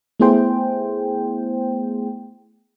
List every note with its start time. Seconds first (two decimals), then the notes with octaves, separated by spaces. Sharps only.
0.20 A3 B3 E4 G#4 C5 G5